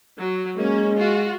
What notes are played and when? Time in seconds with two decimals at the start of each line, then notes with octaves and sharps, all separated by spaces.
0.16 F#3
0.57 G#3 A#3 C#4
0.97 F4 F#4